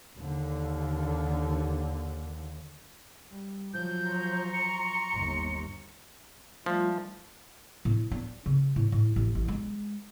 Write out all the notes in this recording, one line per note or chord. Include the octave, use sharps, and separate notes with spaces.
D#2 D3
G3
F3 F#3 G6
A#5 C6 C#6
C#7
G1 D#2
F3 G3 A3 F4
A2
D4
C#3
A2
A2
A1
A1
G#3